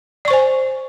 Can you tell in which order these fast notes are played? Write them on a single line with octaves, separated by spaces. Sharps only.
D5 C#6 C5 G#5